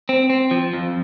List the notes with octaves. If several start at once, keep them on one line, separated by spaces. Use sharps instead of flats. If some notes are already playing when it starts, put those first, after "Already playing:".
C4
C4
F3
F2